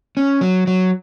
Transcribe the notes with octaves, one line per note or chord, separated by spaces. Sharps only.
C#4
F#3
F#3